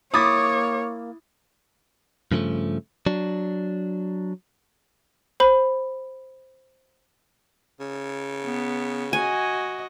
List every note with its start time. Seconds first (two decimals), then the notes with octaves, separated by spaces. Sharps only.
0.14 A#3 E4 C#5 D6 D#6 A6
2.32 G2 C#3 F3 G#3 A3
3.06 F#3 D4
5.40 C5 B5
7.80 C#3
8.44 B3
9.13 F#4 D#5 G#5